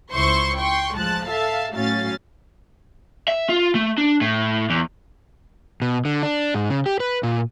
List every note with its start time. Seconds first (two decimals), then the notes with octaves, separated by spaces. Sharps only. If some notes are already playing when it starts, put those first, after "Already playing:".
0.13 C#2 E4 C5 C6 C#6
0.58 G5 C6 C#6
0.96 A1 F3 G#3 A5 F#6
1.27 A4 E5 F5 A5
1.74 A2 F#3 C#4 F5 A6
3.28 E5
3.49 F4
3.75 A3
3.98 D4
4.21 A2
4.70 E2
5.82 B2
6.05 D3
6.23 D4
6.54 G#2
6.70 C#3
6.86 G4
7.00 B4
7.23 A#2